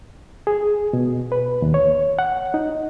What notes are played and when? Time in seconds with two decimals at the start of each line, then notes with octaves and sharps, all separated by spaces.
0.47 G#4
0.93 B2
1.32 B4
1.62 D#2
1.74 C#5
2.19 F#5
2.54 D#4